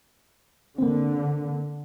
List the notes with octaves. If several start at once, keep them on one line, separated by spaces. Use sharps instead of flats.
D3 A#3 C4